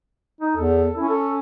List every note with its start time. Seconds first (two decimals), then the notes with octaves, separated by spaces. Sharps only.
0.41 D#4
0.56 E2 A4
0.97 C#4 E4
1.09 A4